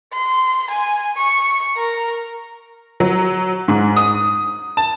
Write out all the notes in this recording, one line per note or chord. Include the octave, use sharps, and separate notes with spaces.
C6
G#5
C#6
A#4
F#3
G#2
D#6
A5